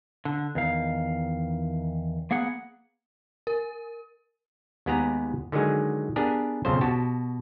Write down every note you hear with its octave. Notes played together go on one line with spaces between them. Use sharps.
D3
E2 D#3 F5
A#3 B3 G#4 F#5
A#4
D#2 G#3 B3 G4 G#4 A#5
D3 D#3 F#3 G#3 G#4
B3 D4 G4 G#4 A#4
B1 F2 C#3 C5
B2 F#4 G4 A5